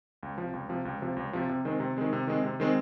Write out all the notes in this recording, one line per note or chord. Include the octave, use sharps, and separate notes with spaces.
C#2
C3 F3
C#2
C3 F3
C#2
C3 F3
C#2
C3 F3
C3
D#3 G#3 C4
C3
D#3 G#3 C4
C3
D#3 G#3 C4
C3
D#3 G#3 C4